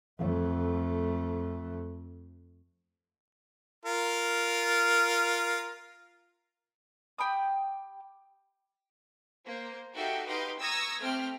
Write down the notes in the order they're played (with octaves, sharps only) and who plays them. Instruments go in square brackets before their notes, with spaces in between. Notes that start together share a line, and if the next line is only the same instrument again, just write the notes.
[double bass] F2 A3
[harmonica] F4 A#4
[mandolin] G4 G5 B5 D#6
[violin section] A#3 C5
D#4 F#4 G4 A4 E5 F5
D#4 G4 B4 F5 C6
A#5 C#6 D#6 E6 G#6 A#6
A3 C4 G4 F6